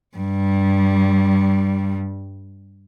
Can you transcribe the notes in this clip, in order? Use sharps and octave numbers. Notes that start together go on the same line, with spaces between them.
G2 G3